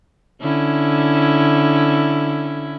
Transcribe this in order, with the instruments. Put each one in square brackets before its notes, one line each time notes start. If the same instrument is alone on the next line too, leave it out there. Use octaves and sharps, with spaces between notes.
[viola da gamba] D3 C#4 E4